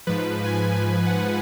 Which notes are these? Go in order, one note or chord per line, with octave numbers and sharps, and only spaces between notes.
G#2 F3 B4
G#5
G#5
F#5